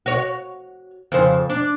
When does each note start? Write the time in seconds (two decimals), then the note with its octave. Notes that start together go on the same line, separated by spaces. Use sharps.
0.06 F#4 C#5
1.12 F2 C#3 C5
1.49 D4